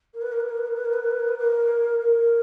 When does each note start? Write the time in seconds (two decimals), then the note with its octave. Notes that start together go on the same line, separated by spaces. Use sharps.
0.14 A#4
0.22 B4
0.32 A#4
0.40 B4
0.49 A#4
0.58 B4
0.67 A#4
0.76 B4
0.85 A#4
0.93 B4
1.03 A#4
1.11 B4
1.20 A#4
1.28 B4
1.38 A#4
2.00 A#4